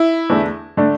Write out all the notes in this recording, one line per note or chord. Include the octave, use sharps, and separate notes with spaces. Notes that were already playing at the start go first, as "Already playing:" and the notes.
Already playing: E4
E2 D3 A3 D4
D3 A3 D4